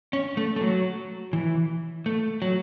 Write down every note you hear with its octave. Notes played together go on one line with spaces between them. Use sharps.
C#4
A3
A3
F#3
E3
A3
F#3